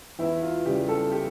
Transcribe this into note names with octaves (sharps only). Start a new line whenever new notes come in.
E2 E4
F4
C#3 G3 G4
A4
G4